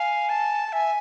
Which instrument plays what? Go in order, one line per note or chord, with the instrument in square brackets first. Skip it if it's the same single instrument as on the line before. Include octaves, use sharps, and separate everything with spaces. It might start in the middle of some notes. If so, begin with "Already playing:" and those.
Already playing: [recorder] F5 [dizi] G#5
[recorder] A5
[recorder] E5 [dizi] G#5